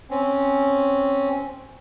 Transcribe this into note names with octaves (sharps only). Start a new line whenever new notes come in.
C4 C#4